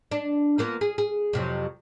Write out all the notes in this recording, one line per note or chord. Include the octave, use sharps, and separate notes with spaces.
D4
F3 A#3 B3
G#4
G#4
F2 C3 F#3